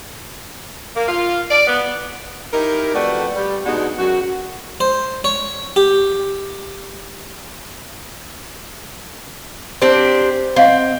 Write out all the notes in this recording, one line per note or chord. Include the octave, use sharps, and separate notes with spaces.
A#3
F4
D5
B3
D#4 E4 G4 A#4
F2 A3 F#4 G4 B4 D5
G3
B2 G#3 B3 D4 D#4 F#4
F#2 F#4
C5
C#5
G4
C4 D4 G4 C5
C4 D#5 F5 F#5